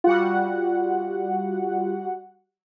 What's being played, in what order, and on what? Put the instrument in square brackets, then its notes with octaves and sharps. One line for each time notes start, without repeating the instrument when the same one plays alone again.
[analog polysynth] G3 F#4 F#5 [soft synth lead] F4